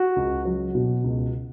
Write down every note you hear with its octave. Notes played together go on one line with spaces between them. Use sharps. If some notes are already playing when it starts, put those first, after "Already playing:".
Already playing: F#4
C#2
F#3
B2
C#2